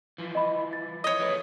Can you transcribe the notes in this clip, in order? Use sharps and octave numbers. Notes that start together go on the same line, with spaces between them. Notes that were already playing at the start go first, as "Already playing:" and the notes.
E3 F3
D#5 B5
A6
C#5 D#5
A3 G#4 B4